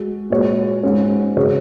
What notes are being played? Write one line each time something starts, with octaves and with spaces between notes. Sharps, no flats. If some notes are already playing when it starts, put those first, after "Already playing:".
Already playing: G#3 F#4
A#2 G#3 F#4 C#5
G#2 G#3 C#4
C#3 G#3 F#4 C#5